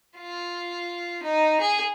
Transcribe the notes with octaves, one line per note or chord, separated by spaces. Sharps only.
F4
D#4
G#4